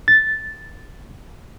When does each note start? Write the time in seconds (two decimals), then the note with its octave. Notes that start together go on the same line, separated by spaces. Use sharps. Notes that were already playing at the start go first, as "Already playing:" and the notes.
0.08 A6